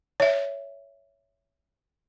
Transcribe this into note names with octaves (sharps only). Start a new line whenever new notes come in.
C#5 E5